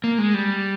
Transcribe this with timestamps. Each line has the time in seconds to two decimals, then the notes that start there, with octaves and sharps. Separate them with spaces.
0.04 A#3
0.18 G#3
0.34 G3